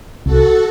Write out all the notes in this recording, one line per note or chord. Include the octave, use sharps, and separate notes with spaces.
C2 F#4 A4